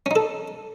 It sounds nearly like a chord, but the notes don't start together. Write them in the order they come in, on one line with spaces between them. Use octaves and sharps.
C#4 D#4 A4